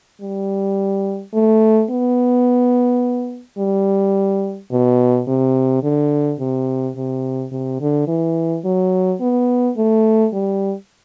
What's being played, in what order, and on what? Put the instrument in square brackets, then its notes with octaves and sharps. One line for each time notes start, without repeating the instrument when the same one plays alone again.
[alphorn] G3
A3
B3
G3
B2
C3
D3
C3
C3
C3
D3
E3
F#3
B3
A3
G3